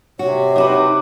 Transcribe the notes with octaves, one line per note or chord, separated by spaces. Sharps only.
C3 F#4 C#5
D#4 F#4 B4 D6